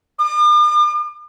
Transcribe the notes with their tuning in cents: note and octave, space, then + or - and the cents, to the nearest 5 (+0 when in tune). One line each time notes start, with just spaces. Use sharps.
D6 +45